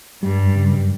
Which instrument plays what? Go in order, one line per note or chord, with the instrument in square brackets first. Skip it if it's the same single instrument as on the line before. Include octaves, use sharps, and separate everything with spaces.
[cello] G2 [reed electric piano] G3
[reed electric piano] F#2
C#3
F#2